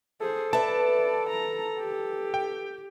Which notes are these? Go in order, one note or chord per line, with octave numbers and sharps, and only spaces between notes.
G#4 A4 C5
B4 D5 E5 A5
A#5
G4
G5